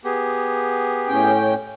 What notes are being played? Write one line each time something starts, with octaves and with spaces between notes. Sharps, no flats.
B3 G4 G#4
A2 C#4 G5